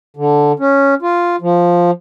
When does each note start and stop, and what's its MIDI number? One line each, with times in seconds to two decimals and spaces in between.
0.17 0.52 50
0.60 0.94 61
1.02 1.36 65
1.41 1.91 53